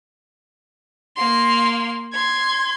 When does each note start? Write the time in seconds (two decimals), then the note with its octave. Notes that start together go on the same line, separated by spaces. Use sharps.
1.17 A#3 C6
2.13 C6 G#6